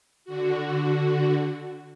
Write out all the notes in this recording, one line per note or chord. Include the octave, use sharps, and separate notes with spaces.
D3 F#4